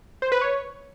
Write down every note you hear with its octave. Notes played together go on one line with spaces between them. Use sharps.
C5
B4
C#5